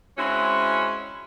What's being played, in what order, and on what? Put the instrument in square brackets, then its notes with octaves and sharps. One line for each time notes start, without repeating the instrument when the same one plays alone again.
[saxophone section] G#3 C4 C#4 E4 F#4